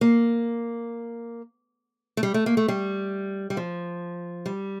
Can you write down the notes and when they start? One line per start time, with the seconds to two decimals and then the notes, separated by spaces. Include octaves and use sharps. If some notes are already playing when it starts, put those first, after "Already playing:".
0.01 A#3
2.17 A3
2.23 G3
2.34 A3
2.46 A#3
2.57 A3
2.68 G3
3.50 G3
3.57 F3
4.46 G3